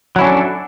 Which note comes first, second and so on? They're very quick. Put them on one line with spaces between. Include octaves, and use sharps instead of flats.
F#3 E4 C#4 D4 A4